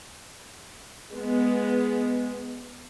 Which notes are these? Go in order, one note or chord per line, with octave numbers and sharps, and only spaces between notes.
G#3 B3